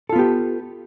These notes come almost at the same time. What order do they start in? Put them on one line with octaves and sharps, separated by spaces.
A4 F4 B3 G4